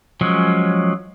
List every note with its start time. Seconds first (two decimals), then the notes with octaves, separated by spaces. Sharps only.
0.21 F3 F#3 G#3 C#4